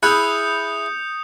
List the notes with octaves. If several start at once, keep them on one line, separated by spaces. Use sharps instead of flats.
E4 G#4 B5 D#6 F#6 G6 C#7